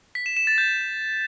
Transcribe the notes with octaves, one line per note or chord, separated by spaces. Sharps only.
B6
E7
E7
A6
G6